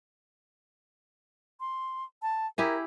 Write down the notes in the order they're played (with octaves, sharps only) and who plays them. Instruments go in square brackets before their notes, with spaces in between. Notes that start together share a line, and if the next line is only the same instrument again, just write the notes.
[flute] C6
A5
[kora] E4 G4 G#4 [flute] A#4